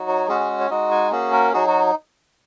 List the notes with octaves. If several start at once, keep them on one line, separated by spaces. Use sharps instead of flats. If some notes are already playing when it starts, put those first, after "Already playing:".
Already playing: F#3 D#4 F#4
C#5
G#3 C#4 F#4 G#4
G#4
C#5
G#3 D#4 F#4 D#5
G#5
A#3 C#4 F#4 G#4
A#4
F#3 D#4 F#4 G#4
F#4